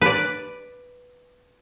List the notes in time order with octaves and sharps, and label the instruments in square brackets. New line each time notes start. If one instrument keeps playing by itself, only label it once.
[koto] B4 D5